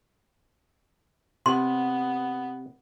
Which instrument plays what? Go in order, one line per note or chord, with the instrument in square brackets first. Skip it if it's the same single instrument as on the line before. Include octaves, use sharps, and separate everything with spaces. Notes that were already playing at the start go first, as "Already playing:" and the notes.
[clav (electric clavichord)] C3 [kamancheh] B3 [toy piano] C6